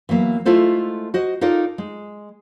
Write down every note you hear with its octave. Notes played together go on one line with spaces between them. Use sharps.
E3 F#3 A#3 B3
G#3 A3 E4 F4 A4 C5
F#4 C5 D#5
D#4 F4 A4 A#4 D5
G#3